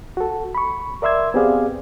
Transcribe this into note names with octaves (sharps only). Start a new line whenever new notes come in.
F#4 A4
B5 C#6
A#4 D5 E5 C6 E6 G#6
B3 C4 G4 G#4 D5 F5